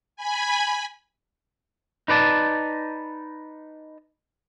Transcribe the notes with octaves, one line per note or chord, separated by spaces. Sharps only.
G#5 B5
D#4 B4 D5 A5